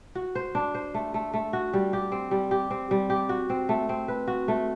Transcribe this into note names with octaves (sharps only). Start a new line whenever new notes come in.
F#4
C5
D4
C5
A3
A3
A3
F#4
G3
G4
C4
G3
G4
C4
G3
G4
F#4
C4
A3
C4
B4
F#4
A3